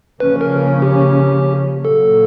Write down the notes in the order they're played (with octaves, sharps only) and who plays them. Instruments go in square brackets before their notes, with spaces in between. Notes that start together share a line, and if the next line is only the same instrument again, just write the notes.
[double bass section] C#3 F3 A#3 C#4 [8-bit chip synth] B4
[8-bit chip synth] A#4
G4
[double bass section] A#2 F#3 A#3 [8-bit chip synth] A4